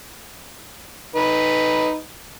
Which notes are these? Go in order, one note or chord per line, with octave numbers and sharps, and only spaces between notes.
D#4 B4